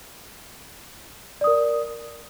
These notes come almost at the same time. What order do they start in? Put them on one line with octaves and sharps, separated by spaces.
D5 D#6 A#4